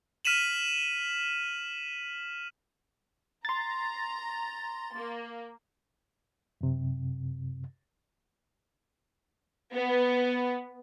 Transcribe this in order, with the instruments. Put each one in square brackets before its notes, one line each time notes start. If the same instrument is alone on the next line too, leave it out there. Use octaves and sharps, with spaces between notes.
[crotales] F6 B6 D#7 E7 F#7
[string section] A#5 [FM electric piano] C6 A6
[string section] A#3
[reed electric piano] F#2 C3
[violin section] B3